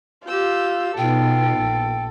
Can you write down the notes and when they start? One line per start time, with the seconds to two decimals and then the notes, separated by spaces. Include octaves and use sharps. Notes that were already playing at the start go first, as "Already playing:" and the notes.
0.27 F4 G4 E6 G6
0.98 B2 B3 D#4 F4 A4 G5
1.59 A#1